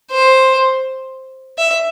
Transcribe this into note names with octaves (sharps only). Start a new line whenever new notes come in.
C5
E5